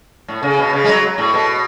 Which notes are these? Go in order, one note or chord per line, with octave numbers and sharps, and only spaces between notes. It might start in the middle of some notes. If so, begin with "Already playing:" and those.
A2
C#3
B2
C#3
G#3
F#3
A2
B2